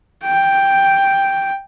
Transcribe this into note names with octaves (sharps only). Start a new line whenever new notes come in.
G5